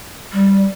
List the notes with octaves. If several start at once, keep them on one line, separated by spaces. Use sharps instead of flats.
G3